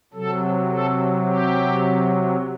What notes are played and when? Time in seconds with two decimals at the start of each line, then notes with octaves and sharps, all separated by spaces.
0.13 C3 F#3 A4
0.70 A4
1.26 G4